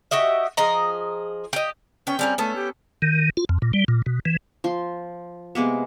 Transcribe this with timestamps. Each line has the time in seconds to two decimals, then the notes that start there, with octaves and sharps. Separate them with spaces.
0.11 F#4 G4 D#5 E5
0.57 F3 G#4 D#5 A#5
1.53 G4 D#5
2.07 B3 C#4 G5
2.19 G3 C4 C#4 A#4
2.38 A3 B3 C#4 A4
2.56 G4
3.02 D#3
3.37 F4
3.49 F2
3.62 A#2
3.73 G3
3.88 A#2
4.06 B2
4.25 E3
4.64 F3 C6
5.55 C3 G#3 A#3 B3